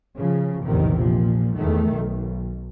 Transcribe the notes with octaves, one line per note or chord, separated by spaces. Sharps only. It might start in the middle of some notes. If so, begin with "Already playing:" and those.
C#3 F3
A#1 E2 A2 C3 D#3
A#2 F3
E2 D#3 A3
B1